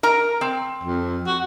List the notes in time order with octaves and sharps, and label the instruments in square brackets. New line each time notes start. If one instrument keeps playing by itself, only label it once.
[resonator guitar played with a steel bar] A#4 A#5
C4
[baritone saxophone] F2
F#4